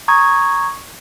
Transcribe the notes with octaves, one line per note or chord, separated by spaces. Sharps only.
A#5 C#6 D#6 G#6